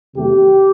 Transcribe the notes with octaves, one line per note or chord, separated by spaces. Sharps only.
E2 C3 D#3 F#3 A3 G4